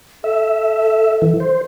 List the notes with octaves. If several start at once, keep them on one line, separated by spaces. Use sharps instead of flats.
A4 E5
E3
C5